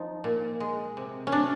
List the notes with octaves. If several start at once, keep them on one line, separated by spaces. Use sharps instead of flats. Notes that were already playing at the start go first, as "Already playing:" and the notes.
Already playing: F3 D#4
A#2
G#3
C3
C#4
C3 D4